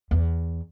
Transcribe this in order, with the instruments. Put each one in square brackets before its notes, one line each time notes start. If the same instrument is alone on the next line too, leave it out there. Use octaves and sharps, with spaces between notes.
[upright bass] E2